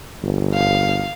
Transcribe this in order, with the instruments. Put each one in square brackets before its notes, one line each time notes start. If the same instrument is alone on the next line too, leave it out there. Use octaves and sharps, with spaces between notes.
[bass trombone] G1
[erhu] F5